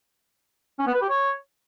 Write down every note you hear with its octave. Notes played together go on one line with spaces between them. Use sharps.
C#4
B3
B4
G4
C#5